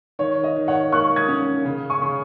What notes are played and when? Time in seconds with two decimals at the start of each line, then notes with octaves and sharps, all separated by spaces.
0.19 D#3 C#5
0.43 D#5
0.56 D#3
0.68 C#5 F#5
0.92 A#3 C#6 F#6
1.16 D#6 G#6
1.28 C#4
1.65 C#3
1.90 G#5 C#6
2.02 C#3